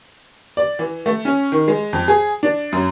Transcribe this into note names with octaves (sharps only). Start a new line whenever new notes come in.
D5
E3
A3
C#4
D#3
G#3
F2
G#4
D4
F#2